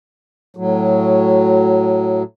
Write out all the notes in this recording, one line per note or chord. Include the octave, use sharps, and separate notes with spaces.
A2 F#3